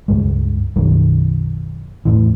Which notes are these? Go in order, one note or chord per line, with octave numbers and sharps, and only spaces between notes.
C#2 G2 G#3
B1 F#2 D#3 G3
E2 A2 E3